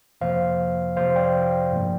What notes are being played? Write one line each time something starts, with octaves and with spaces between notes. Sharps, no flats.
F2 C3 F3 A#3 C5 F5
F2 C3 F3 C5 F5
D5 G5
G2 F3 A#3